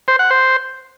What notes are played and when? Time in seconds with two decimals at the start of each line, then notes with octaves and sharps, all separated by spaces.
0.08 C5
0.19 F#5
0.31 C5